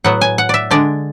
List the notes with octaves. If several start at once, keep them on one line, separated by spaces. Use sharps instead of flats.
A2 F#3 B3 F#5
G#5
F#5
D5 E5
D3 G#3 D4 D5